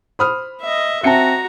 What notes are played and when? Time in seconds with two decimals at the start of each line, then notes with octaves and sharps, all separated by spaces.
0.19 C5 B5 D#6 F6
0.61 D#5 E5
1.03 C4 F#4 E5 A5 A#5 C#7 G7